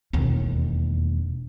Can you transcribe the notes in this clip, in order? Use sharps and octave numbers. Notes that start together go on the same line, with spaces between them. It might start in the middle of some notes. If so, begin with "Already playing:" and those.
E1 D#2